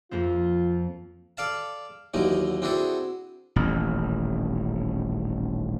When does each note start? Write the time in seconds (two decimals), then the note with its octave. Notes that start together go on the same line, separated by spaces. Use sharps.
0.11 F2 A#3 C4 F4
1.37 A4 D5 F5 A5
2.14 D#2 D3 E3 F#3 D#4
2.62 C4 D4 E4 F#4 G#4 A4
3.56 D#1 A1